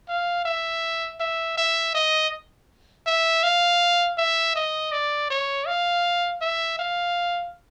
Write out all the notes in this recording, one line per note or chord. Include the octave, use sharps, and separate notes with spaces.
F5
E5
E5
E5
D#5
E5
F5
E5
D#5
D5
C#5
F5
E5
F5